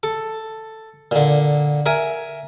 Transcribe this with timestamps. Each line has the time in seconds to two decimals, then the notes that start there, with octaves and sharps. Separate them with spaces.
0.03 A4
1.11 A#2 D3
1.86 A#4 E5 G#5